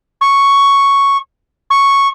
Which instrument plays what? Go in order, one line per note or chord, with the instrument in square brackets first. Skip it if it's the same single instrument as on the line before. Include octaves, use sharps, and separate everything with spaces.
[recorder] C#6
C#6